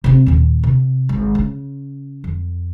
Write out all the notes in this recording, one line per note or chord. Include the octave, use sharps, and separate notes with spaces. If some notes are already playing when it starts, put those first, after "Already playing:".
C3 C4
D#2 A#2
C3
G#1
C#3
F2